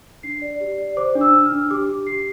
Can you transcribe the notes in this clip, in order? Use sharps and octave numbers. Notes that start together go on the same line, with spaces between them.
D4 C7
D5
G4
D5
C5 D6
D4
E6
D4
F6
D4
G4 D6
G4
G4 C7